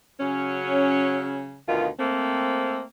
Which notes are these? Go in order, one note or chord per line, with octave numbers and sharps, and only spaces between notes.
C#3 F#3 C#4
D2 B2 D#3 F4
A3 A#3 C4